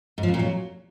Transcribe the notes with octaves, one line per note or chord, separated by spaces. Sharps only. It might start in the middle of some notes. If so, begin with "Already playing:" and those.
G#2
F3
F2
A#2
F#3